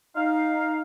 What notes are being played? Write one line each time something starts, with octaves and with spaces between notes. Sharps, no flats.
D#4 F5